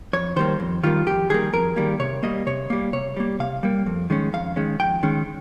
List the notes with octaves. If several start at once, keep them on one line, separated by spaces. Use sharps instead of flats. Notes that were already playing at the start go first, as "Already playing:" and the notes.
F2 C#5
D#3 G3 A#3 C5
F2
D#3 G3 A#3 F4
F2 G4
D#3 G3 A#3 G#4
F2 A#4
D#3 G3 A#3
C3 C#5
G3 A#3 D#5
C3 C#5
G3 A#3
C3 C#5
G3 A#3
C3 F5
G3 A#3
F2
D#3 G#3 C#4
F2 F5
D#3 G#3 C#4
F2 G5
D#3 G#3 C#4